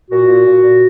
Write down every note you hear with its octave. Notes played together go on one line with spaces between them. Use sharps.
A#2 F#4
A#2
A#2
A#2